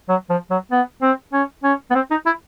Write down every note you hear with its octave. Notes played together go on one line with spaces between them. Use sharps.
F#3
F3
F#3
B3
C4
C#4
C#4
B3
C4
D#4
E4